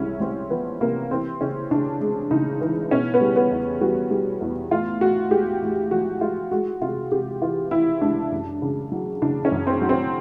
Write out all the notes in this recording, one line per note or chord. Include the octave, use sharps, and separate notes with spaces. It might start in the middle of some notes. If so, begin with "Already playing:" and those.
Already playing: C2 G#3 C#4 E4
C2 C4
F3 B3
C3 A#3
E3 C4
C#3 C#4
C#3 D4
G#3
C#3 D#4
E3
B2 C#4
B3
G3
B3
E2
G3 F#4
G3
E2
A2 F4
A2 F#4
G#3 G4
A2
F3 F#4
G#3 F4
G#3 F#4
C3 F4
C3 G4
E3 F4
E3 E4
C#2 D4
F#2
C#3
F#3
C#3 D4
C#4
F#2
C4
F#3
C4